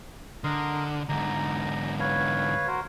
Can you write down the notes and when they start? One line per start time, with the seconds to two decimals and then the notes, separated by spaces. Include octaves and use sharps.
0.44 D3 A#4 D#5 C6
1.09 G#2 D3 D#4 A#5
2.00 B4 C#5 F5
2.67 F#4 A#4 C5